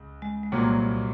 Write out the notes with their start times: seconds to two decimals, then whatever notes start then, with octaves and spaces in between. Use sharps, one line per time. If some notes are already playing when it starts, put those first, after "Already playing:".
Already playing: C#2
0.22 G#3
0.43 G#3
0.52 C2 A#2 F#3 A#3 C4